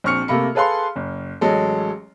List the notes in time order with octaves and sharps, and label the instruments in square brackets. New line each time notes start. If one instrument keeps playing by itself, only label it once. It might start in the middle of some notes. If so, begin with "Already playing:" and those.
[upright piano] A#1 C4 C#6 F6 C#7
C3 A3 A#3 B5 C#7
G#4 A4 B4 F5 C6
F#1
A1 F#3 G#3 A4